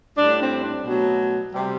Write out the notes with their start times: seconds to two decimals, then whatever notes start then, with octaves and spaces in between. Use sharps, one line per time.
0.18 A2 G3 D4
0.40 C4
0.63 D4
0.85 B2 F#3 A3
1.53 C3 G3